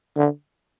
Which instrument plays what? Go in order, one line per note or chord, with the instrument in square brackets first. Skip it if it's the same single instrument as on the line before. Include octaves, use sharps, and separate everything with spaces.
[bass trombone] D3